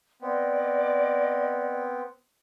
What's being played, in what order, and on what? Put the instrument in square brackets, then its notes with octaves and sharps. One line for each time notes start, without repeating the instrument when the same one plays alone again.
[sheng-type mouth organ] B3 C4 [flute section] D5 D#5